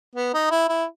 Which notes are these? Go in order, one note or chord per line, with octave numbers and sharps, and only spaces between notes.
B3
D#4
E4
E4